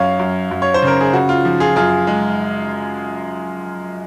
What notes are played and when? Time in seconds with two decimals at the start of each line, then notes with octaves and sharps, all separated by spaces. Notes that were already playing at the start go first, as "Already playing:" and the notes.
Already playing: F#2 C#5 F5
0.19 F#2
0.51 F#2
0.62 C#5
0.74 C5
0.82 C#3 A#4
1.01 G#4
1.13 C#3 F#4
1.29 F4
1.45 F3
1.60 F4 G#4
1.76 F#2 F4 G#4
2.07 G#3